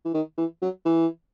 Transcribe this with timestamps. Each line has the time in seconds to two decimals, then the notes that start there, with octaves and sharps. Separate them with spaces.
0.05 E3
0.14 D#3
0.38 E3
0.62 F#3
0.85 E3